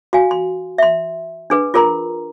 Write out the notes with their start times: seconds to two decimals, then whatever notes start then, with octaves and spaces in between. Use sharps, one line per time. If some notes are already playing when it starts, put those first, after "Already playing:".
0.13 F#4 F5 G#5
0.31 C6
0.78 E5 C6
1.50 D4 G#4 B4
1.74 F4 G#4 A#4 A#5 C6